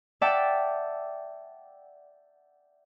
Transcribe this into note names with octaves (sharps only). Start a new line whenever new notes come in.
D5 E5 F#5 G5 A5